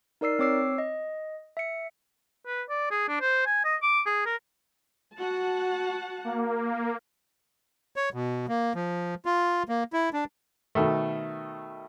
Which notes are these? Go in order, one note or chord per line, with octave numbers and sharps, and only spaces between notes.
D#4 A#4 D5 E6 C7
C4 C#5 D6 E6 C7
D#5
E5 C#7
B4
D5
G#4
D4
C5
G#5
D#5
D6
G#4
A#4
F#4 F#5 A5
A#3
C#5
B2
A#3
F3
F4
A#3
E4
D4
B2 D#3 A3